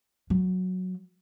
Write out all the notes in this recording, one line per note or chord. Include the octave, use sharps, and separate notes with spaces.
F#3